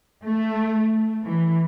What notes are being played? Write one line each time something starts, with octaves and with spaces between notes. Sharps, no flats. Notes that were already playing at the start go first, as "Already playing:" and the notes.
A3
E3